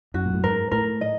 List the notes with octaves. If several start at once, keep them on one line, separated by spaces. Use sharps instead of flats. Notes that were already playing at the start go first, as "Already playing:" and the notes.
F#2 F#4
A#2
A2
G#2 A#4
A2 A#4
D#5